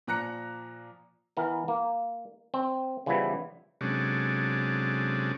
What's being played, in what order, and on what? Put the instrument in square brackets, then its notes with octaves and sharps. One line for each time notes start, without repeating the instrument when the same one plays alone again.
[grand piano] A#2 F3 A#5 F#6 A#6 C#7
[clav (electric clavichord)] E3 B3 A#4
A#3
C4
C#3 E3 F3 G3 B3 E4
[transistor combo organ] C3 F#3 G#3 C#4 D4 A4